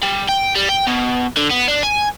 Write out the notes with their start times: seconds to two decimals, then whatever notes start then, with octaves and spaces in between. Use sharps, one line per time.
0.03 G3
0.29 G5
0.55 G3
0.69 G5
0.87 B2
1.37 D3
1.51 B3
1.68 D4
1.83 G#5